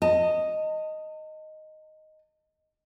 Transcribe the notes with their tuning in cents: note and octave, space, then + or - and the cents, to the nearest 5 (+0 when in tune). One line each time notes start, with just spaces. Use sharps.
D#5 +0 A5 +40